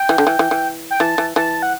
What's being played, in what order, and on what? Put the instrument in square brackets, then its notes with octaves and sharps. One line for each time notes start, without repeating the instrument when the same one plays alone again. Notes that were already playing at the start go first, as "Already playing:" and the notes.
Already playing: [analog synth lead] G5
[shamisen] E3
D3
E3
E3
E3
[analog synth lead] G5
[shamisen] E3 [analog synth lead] A5
[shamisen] E3
[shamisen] E3 [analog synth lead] A5
[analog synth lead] F#5